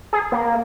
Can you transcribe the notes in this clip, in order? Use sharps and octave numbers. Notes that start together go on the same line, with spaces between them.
G#4
A#3